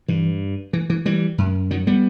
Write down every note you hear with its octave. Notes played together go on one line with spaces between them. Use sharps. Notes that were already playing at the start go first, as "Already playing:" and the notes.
G2 E3
E3
E3
E3 G3
F#2
D#3 F#3
G3 B3